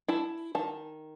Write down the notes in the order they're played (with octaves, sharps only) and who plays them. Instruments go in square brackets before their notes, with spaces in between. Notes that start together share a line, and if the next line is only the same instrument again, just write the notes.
[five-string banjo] E4 A5
D#3 A5